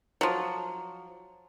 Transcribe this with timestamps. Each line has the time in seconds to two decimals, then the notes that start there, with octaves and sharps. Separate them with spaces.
0.21 F3 F#3